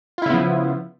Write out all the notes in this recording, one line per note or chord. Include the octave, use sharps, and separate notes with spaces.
C#3 F3 B3 E4 F4